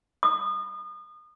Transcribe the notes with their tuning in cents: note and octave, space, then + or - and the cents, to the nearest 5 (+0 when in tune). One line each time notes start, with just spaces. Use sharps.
D#6 -30